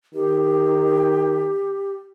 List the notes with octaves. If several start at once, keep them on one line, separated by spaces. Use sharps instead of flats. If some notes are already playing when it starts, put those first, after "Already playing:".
D#3 G4